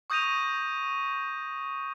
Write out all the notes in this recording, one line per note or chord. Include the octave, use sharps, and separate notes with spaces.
C#6 D#6 G6 A#6 D#7 F7